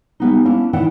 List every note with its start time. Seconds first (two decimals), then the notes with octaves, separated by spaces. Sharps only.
0.20 G3 B3 D#4
0.45 A#3 C#4 D4 E4
0.73 D#3 E3 D5 E5 F#5 G5